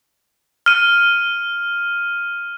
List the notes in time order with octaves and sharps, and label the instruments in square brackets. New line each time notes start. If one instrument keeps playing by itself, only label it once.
[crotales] F6 D#7